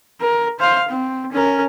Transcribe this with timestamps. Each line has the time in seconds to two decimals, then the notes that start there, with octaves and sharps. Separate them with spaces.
0.21 A#4
0.60 C5 F5
0.89 C4
1.32 C#4 A#4